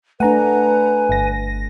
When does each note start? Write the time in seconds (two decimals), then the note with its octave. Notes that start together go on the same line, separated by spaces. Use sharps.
0.20 A3 D4 B4 F#5 G#5 A#5
1.09 G1 A#6